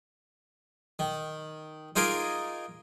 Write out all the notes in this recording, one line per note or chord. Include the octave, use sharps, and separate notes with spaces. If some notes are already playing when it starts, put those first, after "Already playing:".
D#3
D#4 F4 G#4 A#4 D6